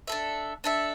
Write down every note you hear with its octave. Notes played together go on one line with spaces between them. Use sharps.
D4 A4 E5
D4 A4 E5